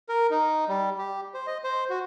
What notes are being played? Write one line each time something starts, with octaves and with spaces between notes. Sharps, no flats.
A#4
D#4
G3
G4
C5
D#5
C5
F#4